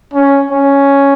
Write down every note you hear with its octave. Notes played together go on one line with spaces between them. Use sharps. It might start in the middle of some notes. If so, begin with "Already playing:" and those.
C#4
C#4